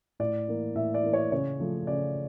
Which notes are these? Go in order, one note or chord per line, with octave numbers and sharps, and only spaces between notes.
A2 D5
E3 A#3
A2 E5
D5
E3 A#3
C#5
C#3 C#5
F3 A3
C#3 D5